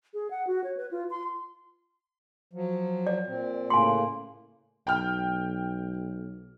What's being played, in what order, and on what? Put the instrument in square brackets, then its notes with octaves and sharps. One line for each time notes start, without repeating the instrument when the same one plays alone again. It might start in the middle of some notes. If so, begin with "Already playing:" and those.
[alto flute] G#4
F#5
F#4
C#5
B4
F4
C6
[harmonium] F3 F#3
[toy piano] D5
[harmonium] A#2 C4
[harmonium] A2 C#3 A#3 [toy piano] G#5 C6
[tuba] B1 [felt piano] G5 F6